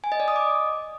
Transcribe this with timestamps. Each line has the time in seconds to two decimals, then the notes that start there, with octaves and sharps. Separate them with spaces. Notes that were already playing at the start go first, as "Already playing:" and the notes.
0.04 G#5
0.12 D#5
0.20 D5
0.28 D#6
0.36 D6